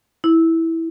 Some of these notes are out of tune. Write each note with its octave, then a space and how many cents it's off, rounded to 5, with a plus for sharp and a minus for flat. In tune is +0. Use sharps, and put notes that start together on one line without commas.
E4 -10